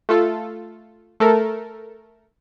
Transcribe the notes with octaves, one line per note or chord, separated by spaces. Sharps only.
A3 F4 A4
A3 A4 A#4